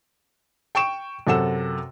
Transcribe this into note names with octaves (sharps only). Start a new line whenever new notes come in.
G5 C#6 D7 E7
F#2 C3 A4 F#5 E7